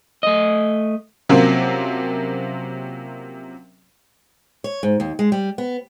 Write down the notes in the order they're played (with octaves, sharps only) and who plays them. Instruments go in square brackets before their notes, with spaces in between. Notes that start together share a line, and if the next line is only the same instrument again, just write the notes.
[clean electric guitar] A3 D#5
[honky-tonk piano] C3 F3 F#3 A#3 C4 C#4
[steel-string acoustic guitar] C#5
G#2
D#2
G#3
G3
B3